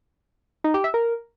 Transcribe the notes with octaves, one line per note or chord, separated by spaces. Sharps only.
D#4
G4
E5
A#4